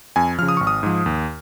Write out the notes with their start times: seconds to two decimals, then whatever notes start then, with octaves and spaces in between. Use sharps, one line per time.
0.16 F2 G#5
0.38 C#3 F3 F6
0.49 D#6
0.57 G#1 C#6
0.67 D#6
0.83 G#2 F3
1.06 D#2